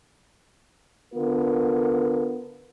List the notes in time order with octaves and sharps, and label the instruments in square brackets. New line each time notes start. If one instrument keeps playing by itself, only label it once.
[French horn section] D3 B3 F4 A#4